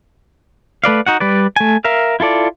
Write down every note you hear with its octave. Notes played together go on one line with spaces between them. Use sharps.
A3 B4 D5 F5
D#4 F#4 F#5
G3 B4 D5
A3 G#5
A#4 E5 F5
E4 F4 A4 D5